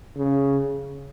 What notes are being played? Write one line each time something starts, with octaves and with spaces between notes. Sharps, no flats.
C#3